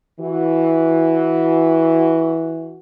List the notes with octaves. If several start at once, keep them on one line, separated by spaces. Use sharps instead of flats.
E3 F#4